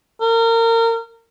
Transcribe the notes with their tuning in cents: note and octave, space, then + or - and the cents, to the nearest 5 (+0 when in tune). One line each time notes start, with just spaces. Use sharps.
A#4 -30